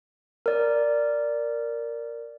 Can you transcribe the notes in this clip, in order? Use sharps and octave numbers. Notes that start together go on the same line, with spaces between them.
A#4 D5